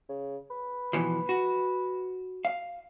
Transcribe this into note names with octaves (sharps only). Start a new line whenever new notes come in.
C#3
B4
B2 E3 F3
F#4
F5